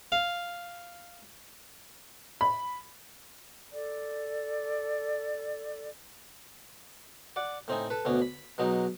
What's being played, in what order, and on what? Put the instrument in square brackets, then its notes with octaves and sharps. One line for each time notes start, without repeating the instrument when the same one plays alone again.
[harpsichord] F5
[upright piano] B5
[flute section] A4 D5
[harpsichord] D5 F#5 D6
A2 C4 D#4 G#5
A4 B4
D2 B2 B3 C#4
B5
B2 F#3 G#3 B3 D#4